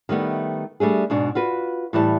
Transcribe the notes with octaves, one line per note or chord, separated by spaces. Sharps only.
D#3 G3 A3 B3
G3 A3 D4 G#4
G#2 B2 D4
F4 F#4 B4
A2 E3 G3 A5